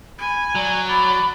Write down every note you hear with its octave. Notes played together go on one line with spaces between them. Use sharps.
G#5 B5
F#3 D5
D5 B5